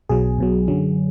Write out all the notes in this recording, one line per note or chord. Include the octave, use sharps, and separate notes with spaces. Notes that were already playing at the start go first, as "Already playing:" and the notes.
B1 B2 F#3 G#4
B1 B2 F#3
F#2 D3 F#3